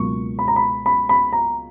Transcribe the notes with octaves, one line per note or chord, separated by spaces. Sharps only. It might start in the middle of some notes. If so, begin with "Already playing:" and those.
Already playing: C#2 B2 F#3 A#3 C#6
B5
A#5
B5
B5
B5
A#5